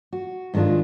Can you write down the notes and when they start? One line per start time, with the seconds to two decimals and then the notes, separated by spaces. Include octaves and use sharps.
0.13 F#4
0.54 G#2 D#3 G#3 D4 F4